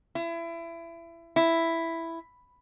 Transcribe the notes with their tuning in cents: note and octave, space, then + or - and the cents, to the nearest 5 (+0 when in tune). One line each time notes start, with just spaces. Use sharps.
E4 +25
E4 +5